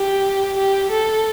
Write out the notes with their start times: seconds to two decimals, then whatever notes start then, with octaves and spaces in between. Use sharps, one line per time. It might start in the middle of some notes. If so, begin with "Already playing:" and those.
Already playing: G4
0.57 G4
0.92 A4